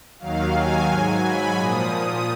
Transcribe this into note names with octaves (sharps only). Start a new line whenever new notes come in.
D#2 D#3 F#3 F5
G#5
G#2 F#3
B5
A#2 F3 D#6